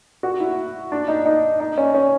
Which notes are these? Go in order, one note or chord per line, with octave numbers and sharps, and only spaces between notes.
F#4
E4
D4
D#4
D#4
D#4
C#4
C#4